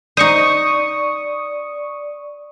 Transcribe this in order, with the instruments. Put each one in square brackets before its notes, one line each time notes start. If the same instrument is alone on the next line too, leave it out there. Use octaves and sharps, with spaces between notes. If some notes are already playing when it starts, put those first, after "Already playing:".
[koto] D#4 C5 [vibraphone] D5 [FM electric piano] C#6 D#6